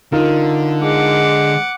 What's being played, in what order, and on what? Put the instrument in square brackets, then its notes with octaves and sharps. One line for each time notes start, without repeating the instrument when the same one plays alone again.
[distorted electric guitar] D3 [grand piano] D#4 F4 A#4
[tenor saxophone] G#3 [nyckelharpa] F#5 D6